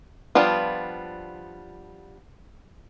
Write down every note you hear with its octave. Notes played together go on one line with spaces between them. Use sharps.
F3 G3 B3 D4 F4